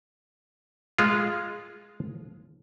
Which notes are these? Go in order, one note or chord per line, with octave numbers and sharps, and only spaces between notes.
G#3 F4